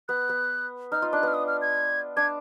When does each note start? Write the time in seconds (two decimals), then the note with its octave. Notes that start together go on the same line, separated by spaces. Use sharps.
0.08 B3 F#6
0.29 B3
0.92 D#4 F6
1.02 F4
1.13 D4 F#6
1.23 B3 F6
1.34 D#6
1.47 F6
1.61 G#6
2.17 D4 G#6